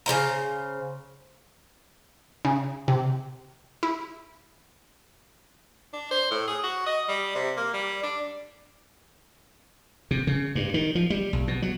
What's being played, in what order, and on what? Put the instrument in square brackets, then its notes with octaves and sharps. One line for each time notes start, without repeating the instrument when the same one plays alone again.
[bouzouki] C#3 F#3 C5 A#5
[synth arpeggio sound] C#3
C3
E4
[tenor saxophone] D4
C5
A2
G#4
F#4
D#5
G3
C3
A#3
G3
D4
[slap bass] C3
C#3
G2
D#3
F3
G3
B1
B2
F#3